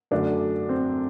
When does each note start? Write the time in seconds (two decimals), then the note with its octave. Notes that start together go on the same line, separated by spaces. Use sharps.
0.11 F#2 D3 A3 D4
0.69 C4